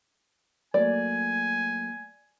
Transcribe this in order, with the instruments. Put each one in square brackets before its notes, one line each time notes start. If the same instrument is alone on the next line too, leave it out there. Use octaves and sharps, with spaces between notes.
[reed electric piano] F#3 A3 A#3 [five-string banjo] D5 [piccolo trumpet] G#5